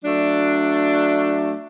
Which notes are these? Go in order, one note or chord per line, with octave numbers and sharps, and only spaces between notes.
F#3 A3 D4